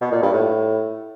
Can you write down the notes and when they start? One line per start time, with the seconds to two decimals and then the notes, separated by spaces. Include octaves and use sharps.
0.01 B2
0.12 A#2
0.22 G2
0.33 A2